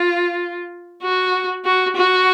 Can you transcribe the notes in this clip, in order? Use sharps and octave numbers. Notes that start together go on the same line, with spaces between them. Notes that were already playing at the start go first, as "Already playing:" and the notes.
Already playing: F4
F#4
F#4
F#4